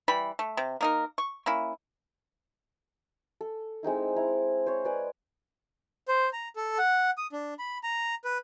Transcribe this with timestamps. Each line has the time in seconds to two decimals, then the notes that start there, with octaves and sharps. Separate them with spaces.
0.08 E3 G3 B5
0.39 A3
0.57 C3
0.81 A#3 D#4 A#4
1.18 C#6
1.46 A#3 C#4 E4
3.41 A4
3.83 G#3 C4 D#4 E4
4.16 E4 A#5
4.67 C5 C#5
4.85 B4 D5 G#5
6.08 C5
6.33 A#5
6.56 A4
6.78 F#5
7.18 D#6
7.32 D4
7.59 B5
7.83 A#5
8.25 B4